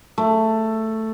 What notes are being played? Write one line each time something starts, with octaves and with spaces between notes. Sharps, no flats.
A3